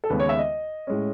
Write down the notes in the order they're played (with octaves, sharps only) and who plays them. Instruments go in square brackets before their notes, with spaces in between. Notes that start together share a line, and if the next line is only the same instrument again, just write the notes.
[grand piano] A4
D#2 C#3 G#3 B3 B4
C#5
E5
D#5
A2 G#3 C#4